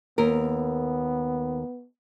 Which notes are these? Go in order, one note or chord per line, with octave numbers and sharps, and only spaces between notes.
D#2 B3 A#4